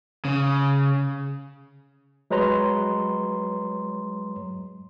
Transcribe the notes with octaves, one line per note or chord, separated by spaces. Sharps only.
C#3
F#3 G#3 B4 C#5 A#5 C6